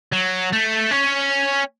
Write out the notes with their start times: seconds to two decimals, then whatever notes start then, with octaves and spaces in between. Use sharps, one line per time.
0.12 F#3
0.52 A3
0.91 C#4